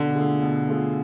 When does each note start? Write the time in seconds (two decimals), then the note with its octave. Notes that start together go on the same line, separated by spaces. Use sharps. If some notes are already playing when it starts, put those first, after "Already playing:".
Already playing: B2 D3
0.15 A3 F4 G#4
0.42 B2
0.68 A3 F4 G#4